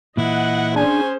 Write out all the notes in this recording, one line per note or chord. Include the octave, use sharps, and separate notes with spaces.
A#2 E3 E4 D#5 F#5
C#4 D4 G#4 C5 G#5